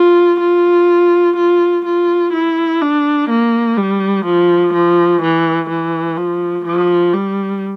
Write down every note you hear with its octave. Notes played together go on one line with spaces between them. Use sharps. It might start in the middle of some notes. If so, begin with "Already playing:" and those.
Already playing: F4
F4
F4
F4
E4
D4
A#3
G3
F3
F3
E3
E3
F3
F3
G3